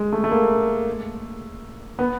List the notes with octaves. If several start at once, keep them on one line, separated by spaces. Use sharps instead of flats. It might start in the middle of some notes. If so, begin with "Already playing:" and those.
Already playing: G#3
A3
A3
A#3
B3